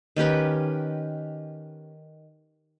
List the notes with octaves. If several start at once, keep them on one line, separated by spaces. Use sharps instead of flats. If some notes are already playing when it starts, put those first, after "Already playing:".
D#3 C#4 G4 B4